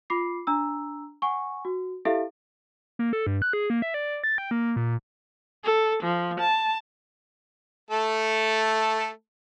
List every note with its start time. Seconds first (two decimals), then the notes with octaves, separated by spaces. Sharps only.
0.10 F4 B5 D6 C7
0.47 D4 A#5 E6
1.22 F#5 G#5 C#6
1.65 F#4
2.05 E4 G4 A4 E5 F5
2.99 A#3
3.13 A4
3.27 G2
3.42 F#6
3.53 G#4
3.70 A#3
3.82 E5
3.94 D5
4.24 A6
4.38 G5
4.51 A#3
4.76 A#2
5.64 A4
6.03 F3
6.39 A5
7.90 A3 A4